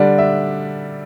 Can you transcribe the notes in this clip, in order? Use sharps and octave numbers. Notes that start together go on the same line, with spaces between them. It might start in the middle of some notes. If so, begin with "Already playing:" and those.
Already playing: D3 G3 D4
E5